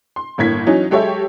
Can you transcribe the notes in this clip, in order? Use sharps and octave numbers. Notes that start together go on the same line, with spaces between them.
C6
G1 A2 A#3 G#6 B6
E3 F#3 C#4 D#4
F#3 G#3 G4 A4 C#5 E5